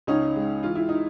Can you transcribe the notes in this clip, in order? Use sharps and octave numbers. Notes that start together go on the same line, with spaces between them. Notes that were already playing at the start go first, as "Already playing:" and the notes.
C#2 C#4 D#4
G#3
E3 F4
E4
D#4